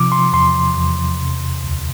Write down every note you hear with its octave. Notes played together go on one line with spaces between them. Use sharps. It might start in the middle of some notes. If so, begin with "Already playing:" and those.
Already playing: C3 F3 D6
C6
E2 C6
E2
C3
D2